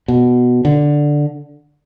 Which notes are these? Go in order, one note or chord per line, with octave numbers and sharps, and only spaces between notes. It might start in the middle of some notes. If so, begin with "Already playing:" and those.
B2
D3